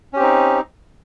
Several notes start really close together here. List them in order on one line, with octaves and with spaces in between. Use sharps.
C#4 G4 C4 D#4